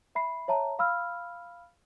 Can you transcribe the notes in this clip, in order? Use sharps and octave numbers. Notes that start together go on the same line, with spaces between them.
E5 B5 C7
C#5 E5 A5 A#5
F5 B5 E6 F6